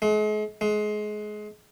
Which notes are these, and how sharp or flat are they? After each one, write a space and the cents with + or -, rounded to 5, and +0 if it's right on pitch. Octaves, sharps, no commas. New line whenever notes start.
G#3 +40
G#3 +25